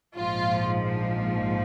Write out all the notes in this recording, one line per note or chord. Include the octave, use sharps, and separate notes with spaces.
A#1 G#2 F3 F4